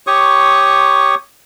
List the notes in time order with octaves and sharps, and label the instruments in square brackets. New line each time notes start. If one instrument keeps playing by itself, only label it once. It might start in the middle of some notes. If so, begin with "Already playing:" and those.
[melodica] G4 C#5 C#6 D#6